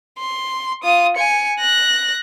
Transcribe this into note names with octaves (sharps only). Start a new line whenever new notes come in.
C6
F4 D#6
G#5 C#7
F#6 A#6